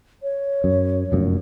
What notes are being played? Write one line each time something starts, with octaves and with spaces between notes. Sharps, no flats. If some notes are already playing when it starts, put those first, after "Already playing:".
C#5
F#2
F1 F#2 A#2